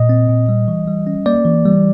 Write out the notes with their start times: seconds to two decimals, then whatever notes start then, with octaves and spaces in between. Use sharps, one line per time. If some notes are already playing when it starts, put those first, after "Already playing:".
Already playing: A#2 D#5
0.09 C4
0.29 A#2
0.49 G3
0.68 E3
0.88 G3
1.07 C#4
1.26 A#3 D5
1.45 E3
1.65 G3